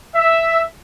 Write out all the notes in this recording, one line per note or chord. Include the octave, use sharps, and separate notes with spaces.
E5